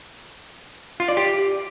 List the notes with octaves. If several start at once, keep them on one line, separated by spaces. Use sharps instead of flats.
F4
D5
G4